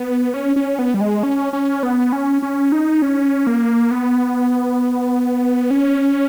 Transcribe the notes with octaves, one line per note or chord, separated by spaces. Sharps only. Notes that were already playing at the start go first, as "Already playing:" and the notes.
Already playing: B3
C#4
C#4
B3
G3
G#3
C#4
C#4
B3
C#4
C#4
D#4
C#4
A#3
B3
C#4